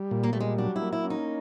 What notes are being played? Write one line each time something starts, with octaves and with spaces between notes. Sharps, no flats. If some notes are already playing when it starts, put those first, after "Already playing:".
Already playing: G3
A#2
A#3
G3 A3
G#3
F#3 D4
E4
A#3
E4
C#4
D#4